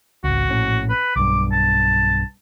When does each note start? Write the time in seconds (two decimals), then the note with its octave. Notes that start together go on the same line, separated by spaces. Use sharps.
0.24 G#1 C#2 F#4
0.48 A#1 A2 C#4
0.90 B4
1.16 B1 G2 D6
1.52 A5